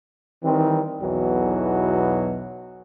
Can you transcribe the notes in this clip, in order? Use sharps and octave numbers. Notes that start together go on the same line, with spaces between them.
D#3 E3 G3 C4
B1 E2 B2 E3 F#3